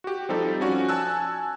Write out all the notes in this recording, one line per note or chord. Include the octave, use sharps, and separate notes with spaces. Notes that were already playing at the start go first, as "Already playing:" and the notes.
F#4 G4
F3 G3 C4 D#4 A4
F3 C#4 F#4 D5
G#5 A5 E6 F#6